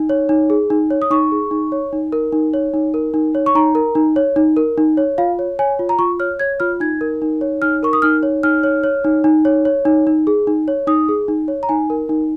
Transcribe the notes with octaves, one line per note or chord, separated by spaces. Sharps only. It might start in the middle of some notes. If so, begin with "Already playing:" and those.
Already playing: D#4
C#5
D#4
G#4
D#4
C#5
D#6
D#4 C#6
G#4
D#4
C#5
D#4
A#4
D#4
C#5
D#4
A#4
D#4
C#5
C#6
D#4 A#5
A#4
D#4
C#5
D#4
A#4
D#4
C#5
F4 F5
C#5
C#5 G#5
F4
A#5
F4 C#6
C#5 F6
C#5 G#6
F4 F6
D#4 G#6
A#4
D#4
C#5
D#4 F6
A#4 C#6
D#6
D#4 F6
C#5
D#4 F6
C#5
C#5
D#4
D#4
C#5
C#5
D#4
D#4
G#4
D#4
C#5
D#4 D#6
G#4
D#4
C#5
A#5
D#4 G#5
A#4
D#4